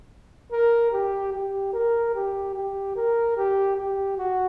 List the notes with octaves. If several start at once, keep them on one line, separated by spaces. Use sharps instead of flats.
A#4
G4
G4
A#4
G4
G4
A#4
G4
G4
F#4